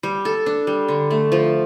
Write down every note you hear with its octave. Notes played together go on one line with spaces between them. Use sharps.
G3
A4
D4
G3
D3
A3
F3